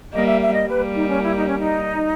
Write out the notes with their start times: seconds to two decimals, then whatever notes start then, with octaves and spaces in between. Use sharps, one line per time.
0.14 G3 A#3 D#5
0.27 E5
0.41 E5
0.54 D#5
0.68 G3 A#3 B4
0.95 D#4
1.08 C#4
1.22 E4
1.35 D#4
1.47 C#4
1.59 D#4